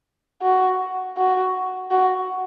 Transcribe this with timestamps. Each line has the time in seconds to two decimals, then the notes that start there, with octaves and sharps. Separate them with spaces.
0.42 F#4
1.17 F#4
1.91 F#4